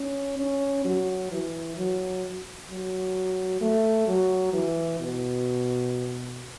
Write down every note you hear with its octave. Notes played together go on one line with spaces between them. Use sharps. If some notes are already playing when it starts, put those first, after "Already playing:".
Already playing: C#4
C#4
F#3
E3
F#3
F#3
A3
F#3
E3
B2